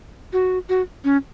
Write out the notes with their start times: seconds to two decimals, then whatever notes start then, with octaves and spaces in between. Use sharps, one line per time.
0.33 F#4
0.69 F#4
1.04 C#4